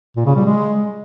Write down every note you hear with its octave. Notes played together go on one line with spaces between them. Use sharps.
A#2
C#3
G3
G#3